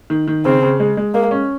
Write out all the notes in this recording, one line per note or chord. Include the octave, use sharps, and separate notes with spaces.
D#3
D#3
C#3 C4
C#3
G#3
G#3
G#3 A#3
C#4